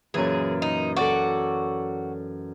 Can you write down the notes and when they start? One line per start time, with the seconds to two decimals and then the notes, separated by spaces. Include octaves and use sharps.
0.14 F#2 A#2 E3 G#4
0.62 D#4
0.96 F#4 A4 D5 D6